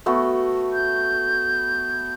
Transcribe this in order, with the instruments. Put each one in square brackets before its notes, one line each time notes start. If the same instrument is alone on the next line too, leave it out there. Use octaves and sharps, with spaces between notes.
[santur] A3 B3 F#4
[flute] G6